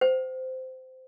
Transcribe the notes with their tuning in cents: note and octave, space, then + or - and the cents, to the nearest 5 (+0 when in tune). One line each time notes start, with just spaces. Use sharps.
C5 -15 G5 -45